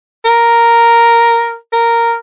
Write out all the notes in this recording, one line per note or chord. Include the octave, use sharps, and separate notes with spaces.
A#4
A#4